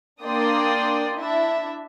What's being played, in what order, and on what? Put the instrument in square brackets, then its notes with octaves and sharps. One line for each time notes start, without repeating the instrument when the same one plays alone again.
[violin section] A#3 D4 D5 G5 C6 D#6
D4 E4 E5